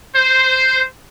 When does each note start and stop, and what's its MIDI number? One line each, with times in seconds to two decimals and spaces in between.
0.16 0.83 72